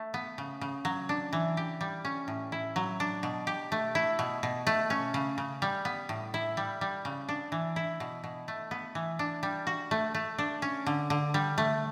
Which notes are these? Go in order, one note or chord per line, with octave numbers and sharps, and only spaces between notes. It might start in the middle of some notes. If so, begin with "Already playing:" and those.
Already playing: A3
B3
C#3
C#3
F#3
D4
E3
G4
G3
C#4
A2
E4
F#3
D4
B2
G4
A3
E4
B2
B2
A3
C#4
C#3
C#3
G3
B3
A2
E4
G3
G3
C#3
D4
E3
E4
B2
B2
A3
B3
E3
D4
G3
F#4
A3
A3
D4
C#4
D3
D3
G3
A3